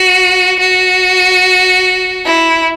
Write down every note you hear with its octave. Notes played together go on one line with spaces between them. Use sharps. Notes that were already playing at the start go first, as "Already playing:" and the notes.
Already playing: F#4
F#4
E4